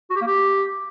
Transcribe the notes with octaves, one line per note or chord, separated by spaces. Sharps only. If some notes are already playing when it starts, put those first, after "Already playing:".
F#4
G4
A#3
G4